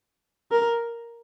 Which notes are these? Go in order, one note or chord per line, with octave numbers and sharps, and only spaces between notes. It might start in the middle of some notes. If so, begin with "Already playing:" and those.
A#4